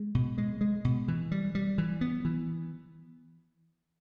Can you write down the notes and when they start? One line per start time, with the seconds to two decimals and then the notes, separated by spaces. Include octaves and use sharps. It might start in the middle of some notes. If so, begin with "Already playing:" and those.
Already playing: G#3
0.15 B2
0.38 G#3
0.61 G#3
0.85 B2
1.08 E3
1.32 G3
1.55 G3
1.78 E3
2.01 B3
2.25 E3